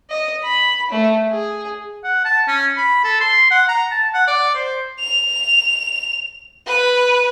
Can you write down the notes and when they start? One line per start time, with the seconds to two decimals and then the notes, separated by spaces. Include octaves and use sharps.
0.10 D#5
0.43 B5
0.91 A3
1.31 G#4
2.04 F#5
2.25 A5
2.48 C#4
2.77 B5
3.04 A4
3.20 C6
3.51 F#5
3.69 A#5
3.91 A5
4.14 F#5
4.27 D5
4.55 C5
5.00 F7
6.67 B4